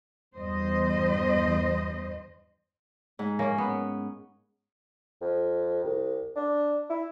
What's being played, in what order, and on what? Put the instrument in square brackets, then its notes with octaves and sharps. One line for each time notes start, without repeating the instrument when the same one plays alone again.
[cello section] E2 G2 C5 D#5
[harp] G#2
[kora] A#3 C#4
B3
[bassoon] F2
C2
D4
E4